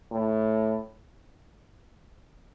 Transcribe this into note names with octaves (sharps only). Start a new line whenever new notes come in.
A2